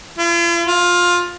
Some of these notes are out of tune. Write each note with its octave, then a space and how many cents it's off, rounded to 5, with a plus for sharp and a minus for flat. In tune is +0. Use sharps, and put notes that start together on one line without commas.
F4 -45
F4 +15